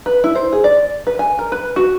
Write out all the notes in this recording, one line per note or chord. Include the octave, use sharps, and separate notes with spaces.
B4
E4
C5
G#4
D5
B4
G#5
A#4
B4
F#4